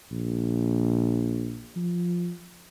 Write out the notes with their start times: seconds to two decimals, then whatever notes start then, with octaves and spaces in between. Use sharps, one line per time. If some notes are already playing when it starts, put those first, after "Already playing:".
0.11 A#1
1.76 F3